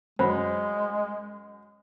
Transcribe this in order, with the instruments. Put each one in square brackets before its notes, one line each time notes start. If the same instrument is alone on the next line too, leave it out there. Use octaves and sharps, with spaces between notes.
[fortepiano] F#2 [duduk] G#3 [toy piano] C5 B5